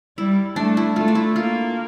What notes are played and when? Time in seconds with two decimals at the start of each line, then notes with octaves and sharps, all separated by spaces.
0.18 G3 E4
0.56 A3 D4
0.77 E4
0.96 A3 F4
1.08 D4
1.15 E4
1.36 A#3 F4